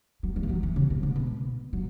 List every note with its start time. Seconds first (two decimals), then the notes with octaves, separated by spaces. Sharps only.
0.23 F#3
0.36 F#3
0.43 E3
0.49 F#3
0.63 E3
0.76 C#3
0.90 B2
1.03 G#2
1.16 B2
1.73 F#3